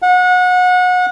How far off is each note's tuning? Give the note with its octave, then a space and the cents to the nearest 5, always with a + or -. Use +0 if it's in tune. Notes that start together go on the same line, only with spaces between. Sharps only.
F#5 -30